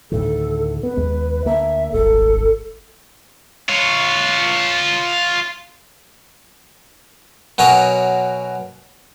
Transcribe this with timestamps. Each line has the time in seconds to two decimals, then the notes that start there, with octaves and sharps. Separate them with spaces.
0.11 D2 A2 D#3 A4
0.83 B3 B4
0.97 D#2 G#3 B3
1.45 D2 A#3 D4 E5
1.92 D#1 G#1 A4
3.69 F4 C#5
7.58 B2 F#3 A#4 C#5 G#5 D#6